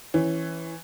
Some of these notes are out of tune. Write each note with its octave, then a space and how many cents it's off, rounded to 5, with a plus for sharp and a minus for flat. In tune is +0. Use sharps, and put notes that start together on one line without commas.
E3 +0 C#4 -10